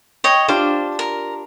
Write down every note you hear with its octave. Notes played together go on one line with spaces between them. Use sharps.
C#5 D#5 G5
D4 F4 G4 C5
A#4